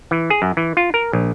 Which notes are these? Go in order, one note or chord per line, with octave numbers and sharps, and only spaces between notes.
E3
G#4
F#2
E3
F4
A#4
A#1